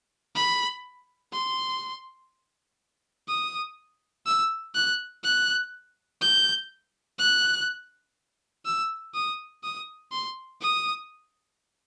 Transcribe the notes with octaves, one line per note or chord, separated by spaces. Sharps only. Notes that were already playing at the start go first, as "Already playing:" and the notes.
B5
C6
D#6
E6
F#6
F#6
G6
F#6
E6
D#6
D#6
C6
D#6